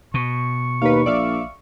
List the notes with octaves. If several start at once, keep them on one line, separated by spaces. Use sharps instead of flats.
B2 C#6
D#2 B4 F5
A#1 D5 E5 F5